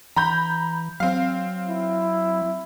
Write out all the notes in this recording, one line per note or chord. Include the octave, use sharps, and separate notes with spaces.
E3 A#5 B5 G6
F#3 C4 F5
E4